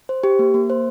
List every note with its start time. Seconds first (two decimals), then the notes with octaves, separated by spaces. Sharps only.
0.09 C5
0.24 G4
0.39 A#3
0.54 A#3
0.70 C5